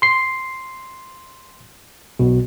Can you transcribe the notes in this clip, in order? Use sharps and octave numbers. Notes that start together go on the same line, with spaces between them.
C6 C7
B1 B2